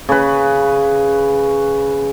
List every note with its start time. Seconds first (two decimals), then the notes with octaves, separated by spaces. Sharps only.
0.09 C#3 B4